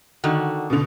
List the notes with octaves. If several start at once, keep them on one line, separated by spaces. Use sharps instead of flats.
D3 D#3 F#4
B2 D3